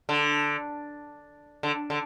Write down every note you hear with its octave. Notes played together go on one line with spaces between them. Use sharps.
D3
D3
D3